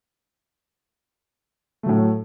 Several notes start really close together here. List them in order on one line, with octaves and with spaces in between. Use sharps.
A3 F#3 A2